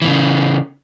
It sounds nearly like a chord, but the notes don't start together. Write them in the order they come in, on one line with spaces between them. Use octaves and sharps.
E3 A#2 C#3